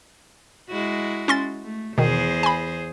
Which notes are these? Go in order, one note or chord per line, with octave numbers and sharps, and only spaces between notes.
G#3 E4 F#4
C#4 C6 A6
A3
E2 B2 D#3 G#4 C5
G#5 B5